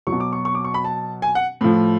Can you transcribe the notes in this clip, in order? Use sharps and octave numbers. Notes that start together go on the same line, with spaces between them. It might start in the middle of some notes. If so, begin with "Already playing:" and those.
F#3 C#6
B2
D6
C#6
C#6
D6
C#6
B5
A5
G#5
F#5
A2 F3